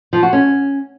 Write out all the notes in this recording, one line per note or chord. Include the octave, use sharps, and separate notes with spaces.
F3
F#4
C#4